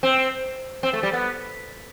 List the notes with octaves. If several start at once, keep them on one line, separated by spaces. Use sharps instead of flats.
C4
C4
A3
G3
B3